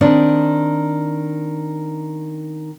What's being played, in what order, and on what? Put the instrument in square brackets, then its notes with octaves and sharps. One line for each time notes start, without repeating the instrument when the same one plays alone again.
[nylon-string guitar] D#3 C4 D4